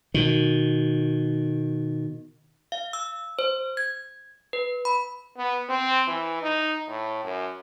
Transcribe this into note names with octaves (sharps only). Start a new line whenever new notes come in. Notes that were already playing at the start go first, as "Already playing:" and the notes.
B2 D#3
F5
E6
C5
G#6
B4
B5
B3
C4
E3
D#4
A2
F#2